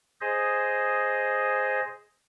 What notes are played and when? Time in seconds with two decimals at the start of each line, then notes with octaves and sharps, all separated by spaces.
0.21 G#4 C5 D#5